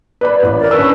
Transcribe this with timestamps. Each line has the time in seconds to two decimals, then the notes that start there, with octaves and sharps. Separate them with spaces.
0.21 B4 D5 B5
0.43 A1
0.58 A#4 D5
0.71 D3 C#4 B4 E6